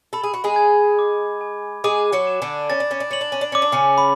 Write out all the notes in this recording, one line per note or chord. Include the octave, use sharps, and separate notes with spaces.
A4 B5
G#4
F#4
G#3 G#4
G#6
D6
G#5
G#3 G#4 D6
F#3 F#4
E7
D3 D4
C#4 A6
D4
C#4
D4
C#4 F#7
D4
C#4
D4
C#4 D6
D4
C#3 C#4
B5